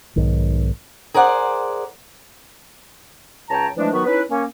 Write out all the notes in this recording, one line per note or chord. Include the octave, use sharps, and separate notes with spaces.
B1 G#2 D#3
G#4 A#4 C5 D5 F#5
C#2 C#5 G5 A5 A#5
E3 F3 G#3 A3 D4
D#3 F#3 B3 F#4 B4 C#6
C#4 D#4 E4 B4
A#3 C#4